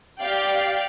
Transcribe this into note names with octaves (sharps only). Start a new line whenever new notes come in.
G4 D5 F5 G5